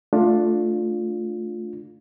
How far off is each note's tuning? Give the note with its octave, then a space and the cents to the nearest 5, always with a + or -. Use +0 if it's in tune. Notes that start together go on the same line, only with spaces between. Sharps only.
A3 +0 D4 +10 F4 +10